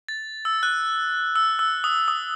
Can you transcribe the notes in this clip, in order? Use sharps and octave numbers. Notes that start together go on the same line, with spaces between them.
A6
E6
F#6
E6
E6
D#6
D#6